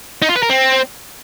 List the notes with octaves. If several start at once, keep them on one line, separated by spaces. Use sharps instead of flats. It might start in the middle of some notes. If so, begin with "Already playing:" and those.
D#4
F4
B4
A#4
C4